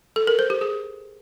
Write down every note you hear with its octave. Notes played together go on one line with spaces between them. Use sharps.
A4
A#4
C5
G4
G#4